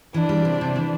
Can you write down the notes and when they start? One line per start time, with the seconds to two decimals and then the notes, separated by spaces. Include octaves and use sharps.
0.14 E3 D4
0.29 G3
0.45 C3
0.61 C3
0.76 E3